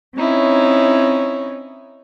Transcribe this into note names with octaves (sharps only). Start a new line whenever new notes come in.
C4 C#4 D#4 E4 C#5